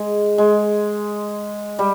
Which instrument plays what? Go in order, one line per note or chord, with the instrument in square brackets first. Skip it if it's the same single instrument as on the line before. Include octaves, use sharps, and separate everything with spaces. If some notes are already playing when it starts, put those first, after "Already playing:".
Already playing: [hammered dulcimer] G#3
G#3
G3